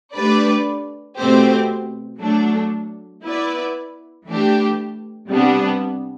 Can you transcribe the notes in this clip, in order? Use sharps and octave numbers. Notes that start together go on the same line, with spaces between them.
A3 D4 G4 B4 D5
B2 A3 C4 G4 C5
F#3 A3 D4
B3 E4 B4 D5
E3 A3 D4 G4
C3 G3 B3 D4